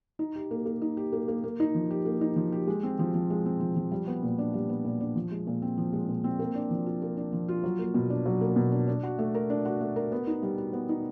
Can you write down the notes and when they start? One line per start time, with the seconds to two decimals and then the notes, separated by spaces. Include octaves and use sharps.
0.19 D#4
0.36 G4
0.51 A#3
0.66 A#3
0.82 D#4
0.97 G4
1.13 A#3
1.28 A#3
1.44 A#3
1.60 D#4
1.75 F3
1.91 G4
2.06 A#3
2.21 D#4
2.36 F3
2.52 G4
2.67 G#3
2.83 C4
2.99 F3
3.14 F3
3.30 G#3
3.46 C4
3.60 F3
3.76 F3
3.91 G3
4.07 B3
4.23 A#2
4.38 D4
4.54 G3
4.69 B3
4.85 A#2
5.00 D4
5.16 F3
5.31 G#3
5.47 A#2
5.62 C4
5.78 F3
5.93 G#3
6.09 A#2
6.24 C4
6.39 A#3
6.55 D4
6.71 F3
6.86 F4
7.02 A#3
7.17 D4
7.33 F3
7.48 F4
7.64 F#3
7.79 A#3
7.94 B2
8.10 D4
8.26 F#3
8.41 A#3
8.56 B2
8.72 D4
8.88 D4
9.03 F#4
9.19 A3
9.34 A#4
9.50 D4
9.65 F#4
9.81 A3
9.96 A#4
10.12 B3
10.27 D#4
10.43 G3
10.58 F#4
10.73 B3
10.89 D#4